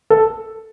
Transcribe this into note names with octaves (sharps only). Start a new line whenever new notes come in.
A4